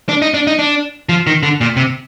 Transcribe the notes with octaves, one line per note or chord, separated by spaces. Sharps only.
D4
D#4
D4
D#4
D4
F3
D#3
D3
A#2
C3